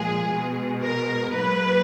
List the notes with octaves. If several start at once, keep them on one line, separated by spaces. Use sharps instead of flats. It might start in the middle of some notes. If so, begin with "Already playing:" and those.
Already playing: A#2 F3 G#3 G#4
B2 G#3
A#4
G#2 F#3 A#3 B4